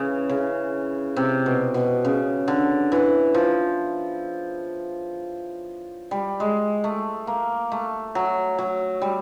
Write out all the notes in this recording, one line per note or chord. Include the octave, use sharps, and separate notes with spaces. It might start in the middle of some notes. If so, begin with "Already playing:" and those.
Already playing: C#3 E3
C#3
C3
B2
B2
C#3
D3
E3
F3
G3
G#3
A3
A#3
A3
F#3
F#3
G3